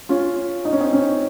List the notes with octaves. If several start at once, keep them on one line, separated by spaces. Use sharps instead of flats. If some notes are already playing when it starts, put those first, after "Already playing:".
C#4 F4
D#4
C#4
C4 D#4
C#4